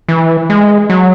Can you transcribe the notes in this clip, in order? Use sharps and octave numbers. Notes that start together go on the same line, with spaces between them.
E3
G#3
F#3